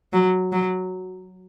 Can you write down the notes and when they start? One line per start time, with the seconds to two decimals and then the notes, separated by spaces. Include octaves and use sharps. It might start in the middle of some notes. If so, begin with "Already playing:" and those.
0.13 F#3
0.52 F#3